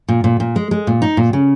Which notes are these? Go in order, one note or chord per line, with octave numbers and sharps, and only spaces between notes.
A#2
A#2
A#2
G#3
G#3
A#2
D#4
A#2
C#3